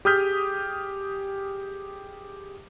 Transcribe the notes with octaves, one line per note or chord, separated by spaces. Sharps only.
G4 G#4 D#6 F6 G6 B6